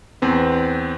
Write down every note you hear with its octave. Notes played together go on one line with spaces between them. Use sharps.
E2 C4 B4